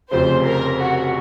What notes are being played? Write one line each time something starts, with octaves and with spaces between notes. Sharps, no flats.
F1 F2 C#3 C5
A#4
F#4